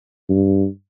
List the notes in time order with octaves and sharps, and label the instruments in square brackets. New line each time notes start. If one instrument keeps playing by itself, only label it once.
[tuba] G2